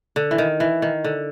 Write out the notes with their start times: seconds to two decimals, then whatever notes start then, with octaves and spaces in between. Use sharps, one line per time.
0.16 D3
0.31 E3
0.38 D#3
0.60 E3
0.82 D#3
1.04 D3